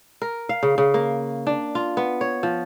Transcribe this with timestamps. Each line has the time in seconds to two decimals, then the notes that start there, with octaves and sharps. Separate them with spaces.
0.22 A#4
0.49 F5
0.63 C#3
0.78 C#3
0.94 A#3
1.47 D4
1.75 F4
1.97 B3
2.21 C#5
2.43 F3